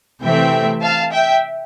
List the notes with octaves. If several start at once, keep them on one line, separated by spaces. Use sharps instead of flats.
C3 E3 A3 C4 E5 G5
F5 A5
E5 G5